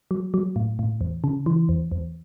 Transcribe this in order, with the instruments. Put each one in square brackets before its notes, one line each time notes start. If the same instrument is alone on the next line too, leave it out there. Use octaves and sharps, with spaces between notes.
[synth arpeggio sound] F#3
F#3
A2
A2
E2
C#3
E3
E2
E2